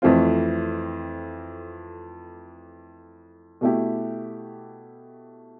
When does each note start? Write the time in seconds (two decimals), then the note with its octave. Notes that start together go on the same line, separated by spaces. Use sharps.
0.02 F2 E3 A3 C4 F4
3.61 B2 A3 E4 G4